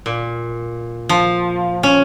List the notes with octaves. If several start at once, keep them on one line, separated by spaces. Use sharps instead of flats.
A#2
F3
C#4